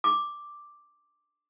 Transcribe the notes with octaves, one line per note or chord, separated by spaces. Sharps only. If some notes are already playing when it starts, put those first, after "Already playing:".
D6